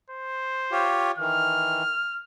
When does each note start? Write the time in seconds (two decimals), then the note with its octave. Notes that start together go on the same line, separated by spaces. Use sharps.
0.10 C5
0.72 F4 G4 C#5
1.18 D#3 E3 F6